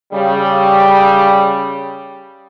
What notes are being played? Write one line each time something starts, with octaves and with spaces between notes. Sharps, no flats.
C#3 G3